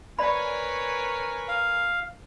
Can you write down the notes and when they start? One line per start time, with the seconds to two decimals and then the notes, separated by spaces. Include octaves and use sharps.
0.19 A#4 B4 C#5 D5 E5 G#5 B5
1.48 F5